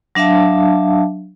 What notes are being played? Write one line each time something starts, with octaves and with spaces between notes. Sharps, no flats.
F#3 D4 E5 F5 A5